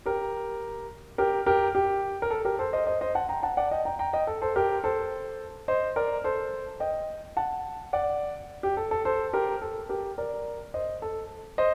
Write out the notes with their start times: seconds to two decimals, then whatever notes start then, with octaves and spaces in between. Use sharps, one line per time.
0.06 G4 A#4
1.18 G4 A#4
1.46 G4 A#4
1.75 G4
2.22 A#4
2.30 A4
2.45 G4 A#4
2.59 A4 C5
2.73 C5 D#5
2.87 C5 D#5
3.01 C5 D#5
3.15 F#5 A5
3.29 G5 A#5
3.43 F#5 A5
3.57 D5 F#5
3.71 D#5 G5
3.85 G5 A#5
3.99 G5 A#5
4.13 D#5 G5
4.27 A4
4.42 A4 C5
4.56 G4 A#4
4.84 A4 C5
5.68 C5 D#5
5.96 A#4 D5
6.24 A4 C5
6.80 D#5 G5
7.37 F#5 A5
7.93 D5 F#5
8.63 G4
8.77 A4
8.91 A4
9.05 A4 C5
9.33 G4 A#4
9.62 A4
9.89 G4 A#4
10.18 A#4 D5
10.74 C5 D#5
11.02 A4
11.58 C5 D#5